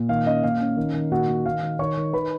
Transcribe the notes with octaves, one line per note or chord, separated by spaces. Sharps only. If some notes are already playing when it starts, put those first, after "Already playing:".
Already playing: A#2
D#3 F5
C#4 D#5
A#2 F5
C#4
D#3
D#3
A#2 F#4 F#5
A#2
D#3 F5
D#3
D#3 C#5 C#6
D#3
D#3 B4 B5